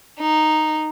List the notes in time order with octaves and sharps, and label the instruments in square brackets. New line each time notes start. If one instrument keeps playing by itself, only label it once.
[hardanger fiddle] D#4